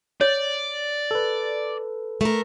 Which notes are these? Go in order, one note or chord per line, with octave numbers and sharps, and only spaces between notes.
C#5 D5
A4 B4
A3 A#4